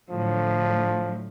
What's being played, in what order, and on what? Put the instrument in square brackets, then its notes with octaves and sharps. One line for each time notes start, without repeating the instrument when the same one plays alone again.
[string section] A2 D3 F#3 [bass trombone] F3